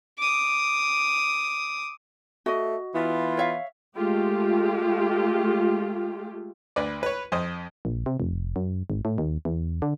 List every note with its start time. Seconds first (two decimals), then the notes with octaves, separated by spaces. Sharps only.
0.18 D6 D#6
2.46 A3 F#4 D#5
2.94 E3 B3 E4 F4
3.37 C#5 E5 F5
3.95 G#3 A3 F4 G4
6.76 D2 B4 D5
7.03 B4 C#5
7.32 F2 C5 D#5
7.85 A#1
8.06 C3
8.20 F1
8.56 F#2
8.90 G#1
9.05 A2
9.18 D#2
9.45 E2
9.82 D3